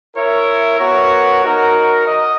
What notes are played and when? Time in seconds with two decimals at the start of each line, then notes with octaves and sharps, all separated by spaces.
0.14 E4 A#4 C#5 E5
0.79 B3 F#4 A#4 C#5
1.43 D#4 F#4 A#4
2.08 D#5